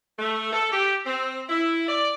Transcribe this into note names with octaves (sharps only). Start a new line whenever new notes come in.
A3
A4
G4
C4
E4
D5